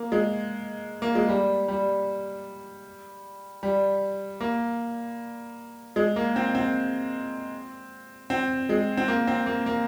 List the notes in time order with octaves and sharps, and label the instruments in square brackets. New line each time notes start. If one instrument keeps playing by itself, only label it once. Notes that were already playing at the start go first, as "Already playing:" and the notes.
Already playing: [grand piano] A#3
G#3
A#3
G#3
G3
G3
G3
A#3
G#3
A#3
C4
C4
C4
G#3
C4
A#3
C4
A#3
A#3